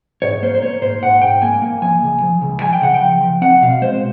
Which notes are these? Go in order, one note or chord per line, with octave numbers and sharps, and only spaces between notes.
G#2 C#5
A#3 C5
C5
A#3 C#5
G#2 C5
G#2 F#5
G#2 G5
A#3 G#5
A#3
F3 G#5
C#2
F3
C#2
F3 G#5
G5
C#3 F#5
G5
F3
F3
C4 F#5
B2 F5
G#3 C5